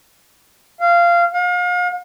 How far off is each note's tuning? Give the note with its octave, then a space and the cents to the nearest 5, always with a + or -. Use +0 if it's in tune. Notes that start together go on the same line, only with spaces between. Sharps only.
F5 -15
F5 +40